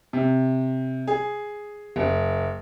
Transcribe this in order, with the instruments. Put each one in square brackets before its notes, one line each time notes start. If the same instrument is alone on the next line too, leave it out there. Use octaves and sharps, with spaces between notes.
[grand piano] C3
G#4
F#1